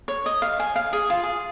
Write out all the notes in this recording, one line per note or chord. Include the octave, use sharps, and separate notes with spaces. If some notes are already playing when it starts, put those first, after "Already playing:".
C#5
D#5
F5
G#5
F5
G#4
F4
G#4